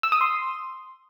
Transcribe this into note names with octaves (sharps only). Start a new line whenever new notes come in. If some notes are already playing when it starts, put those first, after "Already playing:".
E6
D#6
C6